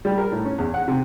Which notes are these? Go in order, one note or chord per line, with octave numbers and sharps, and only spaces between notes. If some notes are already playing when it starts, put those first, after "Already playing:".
G3
A#4
A2
C#4
E2
F#5
C3